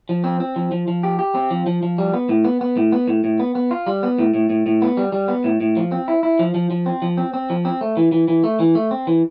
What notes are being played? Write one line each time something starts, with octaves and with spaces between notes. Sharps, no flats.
F3
C4
C4
F3
F3
F3
G4
G4
C4
F3
F3
F3
G3
B3
A2
B3
B3
A2
B3
A2
A2
B3
B3
F4
G3
B3
A2
A2
A2
A2
B3
G3
G3
B3
A2
A2
F3
C4
E4
E4
F3
F3
F3
C4
F3
C4
C4
F3
C4
A3
E3
E3
E3
A3
E3
A3
C4
E3